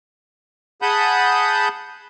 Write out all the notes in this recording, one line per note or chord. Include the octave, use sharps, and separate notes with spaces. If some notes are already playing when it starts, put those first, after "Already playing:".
G#4 F#5 A5 B5 D#6 G6